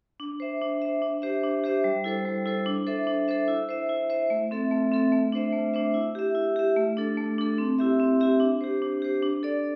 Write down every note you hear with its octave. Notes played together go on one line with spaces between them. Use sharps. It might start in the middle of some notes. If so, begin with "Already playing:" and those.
D4
C5 E5
D4
C5 E5
D4
G4 C5 E5
D4
G4 C5 E5
G3
E4 A4 C5
G3
E4 A4 C5
D4
A4 C5 E5
D4
A4 C5 E5
E4
C5 E5
E4
C5 E5
A3
C4 A4 E5
A3
C4 A4 E5
A3
D4 C5 E5
A3
D4 C5 E5
E4
G4 E5
E4
G4 E5
A3
D4 A4
A3
D4 A4
C4
E4 G4 E5
C4
E4 G4 E5
D4
G4 C5
D4
G4 C5
D4
A4 D5